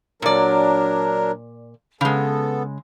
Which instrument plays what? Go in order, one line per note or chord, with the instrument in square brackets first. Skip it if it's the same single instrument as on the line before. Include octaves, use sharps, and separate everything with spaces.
[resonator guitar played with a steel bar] A#2 D5 [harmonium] F#3 D4 A#4
[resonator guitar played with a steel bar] C#3 G#3 [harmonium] B3 A4